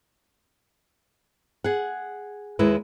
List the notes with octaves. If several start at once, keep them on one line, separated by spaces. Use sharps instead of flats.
G#4 F#5
D#2 G#3 E4 B4